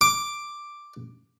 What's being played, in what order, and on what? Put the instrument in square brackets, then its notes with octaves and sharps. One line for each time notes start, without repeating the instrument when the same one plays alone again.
[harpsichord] D6